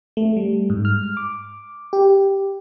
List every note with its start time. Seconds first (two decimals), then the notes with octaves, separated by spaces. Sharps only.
0.17 A3
0.37 G3
0.70 G#2
0.85 F6
1.17 D6
1.93 G4